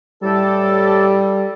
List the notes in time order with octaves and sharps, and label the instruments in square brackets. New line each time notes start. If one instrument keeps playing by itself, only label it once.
[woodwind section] A2 G4 A4 [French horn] G3